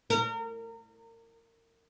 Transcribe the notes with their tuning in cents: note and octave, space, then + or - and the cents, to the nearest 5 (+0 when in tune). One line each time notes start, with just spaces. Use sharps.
A#4 -30